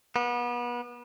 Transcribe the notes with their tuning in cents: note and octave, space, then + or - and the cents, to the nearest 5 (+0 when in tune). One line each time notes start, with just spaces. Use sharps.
B3 -30